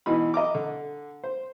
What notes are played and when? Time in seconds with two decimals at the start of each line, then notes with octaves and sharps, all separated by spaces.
0.06 B2 E3 D#4 B5
0.34 D#5 A#5 D6
0.55 D3
1.24 C5